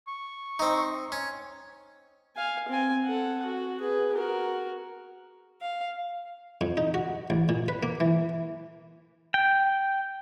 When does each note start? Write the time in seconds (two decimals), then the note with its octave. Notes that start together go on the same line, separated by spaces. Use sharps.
0.08 C#6
0.59 C4 D#4
1.12 C#4
2.36 F5 G#5
2.68 C4 G#5
3.05 A4 F#5
3.46 F#4
3.81 G#4 B4
4.14 F#4 A#4
5.61 F5
6.61 F2
6.77 D#4
6.94 F#4
7.30 A1
7.49 A#2
7.68 B4
7.83 A#3
8.00 E3
9.34 G5